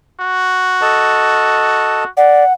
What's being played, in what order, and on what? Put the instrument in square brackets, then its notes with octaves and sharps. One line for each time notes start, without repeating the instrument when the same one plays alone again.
[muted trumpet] F#4
[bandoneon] A4 D#5 A5
[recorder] D5 [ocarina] F#5